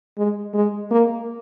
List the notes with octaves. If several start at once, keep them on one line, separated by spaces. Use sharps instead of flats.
G#3
G#3
A#3